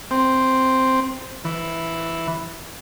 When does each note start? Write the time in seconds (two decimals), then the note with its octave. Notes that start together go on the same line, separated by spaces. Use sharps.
0.11 C4
1.45 E3